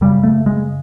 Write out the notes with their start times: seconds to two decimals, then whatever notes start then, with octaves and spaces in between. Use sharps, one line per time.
0.01 F#2 C#3 G3
0.23 A3
0.46 G#3